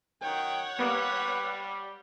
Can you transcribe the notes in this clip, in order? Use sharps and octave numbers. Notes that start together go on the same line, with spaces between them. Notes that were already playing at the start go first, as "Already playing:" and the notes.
F#2 D#3 C#5 F#5 G5
G3 A#3 B3 B4